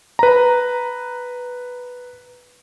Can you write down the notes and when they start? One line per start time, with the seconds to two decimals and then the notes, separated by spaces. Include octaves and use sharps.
0.19 B4 A#5